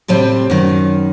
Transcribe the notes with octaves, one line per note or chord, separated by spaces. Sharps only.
A2 C3 G3 C4
F#2 D#3